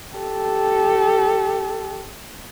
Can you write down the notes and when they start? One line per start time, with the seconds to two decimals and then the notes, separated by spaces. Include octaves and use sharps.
0.16 G4 A4